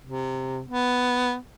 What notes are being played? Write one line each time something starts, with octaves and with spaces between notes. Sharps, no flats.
C3
B3